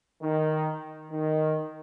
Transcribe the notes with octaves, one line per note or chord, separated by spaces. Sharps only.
D#3
D#3